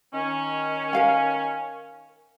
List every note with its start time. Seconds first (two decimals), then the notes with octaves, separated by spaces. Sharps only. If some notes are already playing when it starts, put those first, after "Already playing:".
0.14 D#3 C#4
0.93 A#4 F5 G#5